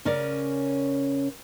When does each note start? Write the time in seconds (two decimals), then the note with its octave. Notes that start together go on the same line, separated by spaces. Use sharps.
0.05 C#3 C#4 A#4 D5